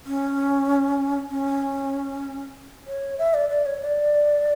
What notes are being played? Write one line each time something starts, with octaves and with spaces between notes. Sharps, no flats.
C#4
C#4
C#5
E5
D5
D5
C#5
D5